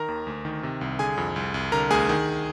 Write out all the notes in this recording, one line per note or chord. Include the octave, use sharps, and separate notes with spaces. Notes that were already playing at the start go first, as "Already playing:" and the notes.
Already playing: D#3 A#4 A#5
D#2
D2
D#3
C3
C2
D3 G#4 G#5
F2
C2
C2
D3 A#4 A#5
D2 G#4 G#5
D#3